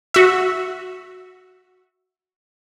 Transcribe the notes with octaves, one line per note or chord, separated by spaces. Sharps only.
F#4 E5